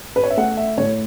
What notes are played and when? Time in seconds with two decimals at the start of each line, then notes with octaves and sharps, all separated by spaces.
0.16 B4
0.23 C#5
0.30 E5
0.37 A3 F#5
0.57 E5
0.78 A2 C#5